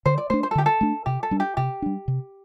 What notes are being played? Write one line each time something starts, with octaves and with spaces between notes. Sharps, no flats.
D3 C5
D5
A3 D4 C5
C5
A4
D3 G4
A4
A3 D4
C3 G4
A4
G3 D4
G4
C3 G4
G3 D4
C3